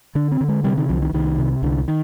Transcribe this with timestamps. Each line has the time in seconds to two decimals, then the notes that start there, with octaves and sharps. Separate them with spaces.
0.15 D3 D4
0.32 C4
0.41 D3
0.48 G#3
0.64 C3 G3
0.77 D#3
0.89 C2 F3
1.02 D#3
1.13 C2 D#3
1.38 C3
1.62 C2 D3
1.88 D#3